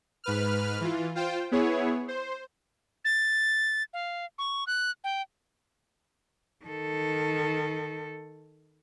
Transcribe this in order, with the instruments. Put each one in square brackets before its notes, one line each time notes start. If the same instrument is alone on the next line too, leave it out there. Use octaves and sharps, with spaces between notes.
[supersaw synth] G#2 B4 F6
E3 F4
F4 C5 G5
B3 E4 G#4 C#5
C5
[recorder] A6
F5
C#6
F#6
G5
[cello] D#3 A4